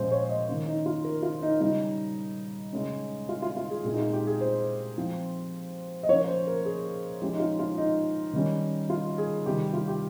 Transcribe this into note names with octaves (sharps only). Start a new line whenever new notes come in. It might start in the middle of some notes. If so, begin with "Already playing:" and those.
Already playing: A#2 F3 G#3 C#4 C5
C#5
D#5
D#3 A#3 C#4
D#4
F4
A#4
F4
D#4
C#3 G3 C#4 D#4
C#3 G#3 C#4
F4
F4
F4
G#4
A#2 G#3 C4 G#4
D#4
F4
G4
G#4
C5
F3 C4
D#5
F3 A#3 C#4 C#5
C5
A#4
G#4
F3 G#3 C#4 G4
D#4
F4
F4
D#4
D#3 G3 C#4
F4
G#4
C3 D#3 G3 C4 G4
F4
G4